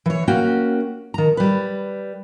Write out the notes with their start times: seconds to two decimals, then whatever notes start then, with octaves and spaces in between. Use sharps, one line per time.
0.06 E3 C#5
0.27 A#3 C#4 F#4 G5
1.14 D#3 A#5
1.37 G3 B4